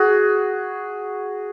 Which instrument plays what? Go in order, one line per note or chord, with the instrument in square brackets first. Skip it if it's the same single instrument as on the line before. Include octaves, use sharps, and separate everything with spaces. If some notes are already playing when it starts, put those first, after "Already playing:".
Already playing: [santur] F#4 G#4